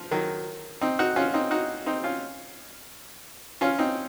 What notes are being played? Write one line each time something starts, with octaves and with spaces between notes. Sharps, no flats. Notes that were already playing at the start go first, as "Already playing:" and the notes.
Already playing: F3
D#3 F#3
C4 D#4
D#4 F#4
C#4 F4
C4 D#4
D#4 F#4
C4 D#4
C#4 F4
C#4 F4
C4 D#4